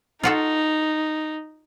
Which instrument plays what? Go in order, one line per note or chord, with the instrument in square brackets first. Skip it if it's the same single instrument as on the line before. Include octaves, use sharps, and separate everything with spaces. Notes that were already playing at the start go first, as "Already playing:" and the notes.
[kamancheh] D#4 [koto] F4 F#4 A4